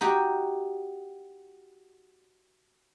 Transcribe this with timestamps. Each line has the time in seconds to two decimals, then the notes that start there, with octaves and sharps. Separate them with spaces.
0.01 D#4 F#4 G4